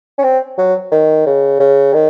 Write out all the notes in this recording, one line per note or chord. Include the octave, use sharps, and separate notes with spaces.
C#4
C4
F#3
D#3
C#3
C#3
D#3